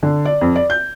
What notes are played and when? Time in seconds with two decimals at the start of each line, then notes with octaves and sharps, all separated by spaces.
0.03 D3
0.25 D5
0.41 F2
0.56 D5
0.70 G6